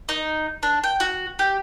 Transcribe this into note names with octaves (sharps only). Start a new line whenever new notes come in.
D#4
D4
G5
F#4
G4